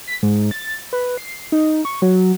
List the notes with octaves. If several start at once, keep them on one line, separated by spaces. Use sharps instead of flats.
B6
G#2
A6
B4
C7
D#4
C#6
F#3